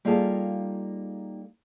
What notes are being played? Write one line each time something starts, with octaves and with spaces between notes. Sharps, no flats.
G3 A#3 D#4 F4 G#4 A4